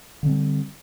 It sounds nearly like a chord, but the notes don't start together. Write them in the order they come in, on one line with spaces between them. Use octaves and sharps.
D3 C4 G3